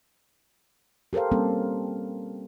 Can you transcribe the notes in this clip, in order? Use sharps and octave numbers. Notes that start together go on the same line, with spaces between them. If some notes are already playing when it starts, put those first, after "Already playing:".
G4 A4 A#4 C5 F5
G3 A#3 C4 C#4 A4